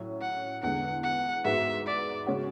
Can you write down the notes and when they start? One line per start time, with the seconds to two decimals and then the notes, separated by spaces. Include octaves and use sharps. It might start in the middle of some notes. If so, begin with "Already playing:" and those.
Already playing: A2 F#3 C#4
0.21 F#5
0.62 E2 D3 G#3 F#5
1.03 F#5
1.44 G#2 G#3 B3 F#4 E5
1.86 D5
2.26 C#3 G#3 C#4 F#4